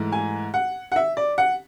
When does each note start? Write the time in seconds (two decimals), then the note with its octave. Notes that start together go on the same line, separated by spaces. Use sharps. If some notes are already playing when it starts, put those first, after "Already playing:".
Already playing: G#2 E3 A3
0.12 G#5
0.54 F#5
0.92 F#5
0.96 E5
1.17 D5
1.38 F#5